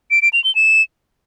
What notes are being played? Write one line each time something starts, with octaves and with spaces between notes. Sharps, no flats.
D7
D7
F7
G7
E7